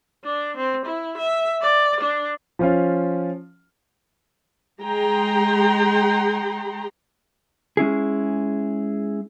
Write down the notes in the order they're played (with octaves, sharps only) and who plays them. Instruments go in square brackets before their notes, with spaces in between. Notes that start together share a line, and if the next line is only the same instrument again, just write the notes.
[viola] D4
C4
E4
E5
D5
D4
[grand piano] F3 C#4 F4
[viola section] G#3 G#4 G5 A#5 C6
[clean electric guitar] G#3 C#4 E4 G#4